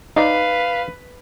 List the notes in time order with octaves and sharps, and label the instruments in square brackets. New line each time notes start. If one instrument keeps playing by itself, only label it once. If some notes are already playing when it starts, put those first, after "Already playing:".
[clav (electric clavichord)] D#4 D5 [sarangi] B4 [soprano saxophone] F5